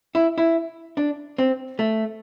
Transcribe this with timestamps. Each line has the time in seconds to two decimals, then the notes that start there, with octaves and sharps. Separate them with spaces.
0.15 E4
0.38 E4
0.97 D4
1.38 C4
1.79 A3